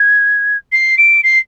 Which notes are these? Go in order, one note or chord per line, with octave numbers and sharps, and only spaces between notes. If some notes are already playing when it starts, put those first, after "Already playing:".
Already playing: G#6
C7
D7
C7